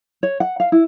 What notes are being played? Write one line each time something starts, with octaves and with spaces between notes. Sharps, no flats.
C#5
F#5
F5
E4